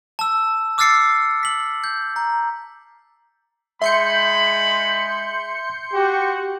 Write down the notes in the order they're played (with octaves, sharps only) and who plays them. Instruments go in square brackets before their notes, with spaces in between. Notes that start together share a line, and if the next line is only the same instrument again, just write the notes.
[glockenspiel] A5 E6
D6 E6 F6 A6 C7 C#7
B6 F#7
G6
A#5
[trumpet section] G#3 B5 [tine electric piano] E5 [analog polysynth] C6 G6 C#7
[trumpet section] F#4 [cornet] G4